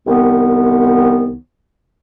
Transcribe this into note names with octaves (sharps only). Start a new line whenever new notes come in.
C2 D#3 B3